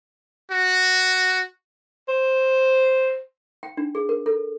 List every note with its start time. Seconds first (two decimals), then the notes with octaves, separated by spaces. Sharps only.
0.51 F#4
2.08 C5
3.63 G5
3.77 D4
3.95 G#4
4.09 A#4
4.26 A4